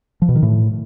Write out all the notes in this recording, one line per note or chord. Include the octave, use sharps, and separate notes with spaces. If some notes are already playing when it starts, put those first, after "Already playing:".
F3
B2
D#3
A2